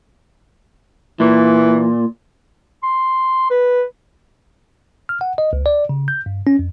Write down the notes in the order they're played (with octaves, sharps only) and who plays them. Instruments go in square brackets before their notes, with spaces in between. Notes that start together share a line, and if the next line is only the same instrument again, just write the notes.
[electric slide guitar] A#2 [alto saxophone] E3
[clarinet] C6
B4
[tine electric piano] F6
F#5
D#5
C#2
D5
C#3
G6
G2
C#4
F2